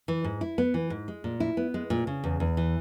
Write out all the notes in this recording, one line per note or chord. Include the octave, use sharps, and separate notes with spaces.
E3
G#2
E4
B3
E3
G#2
G#3
A#2
E4
B3
G#3
A#2
C#3
E2
E2
E3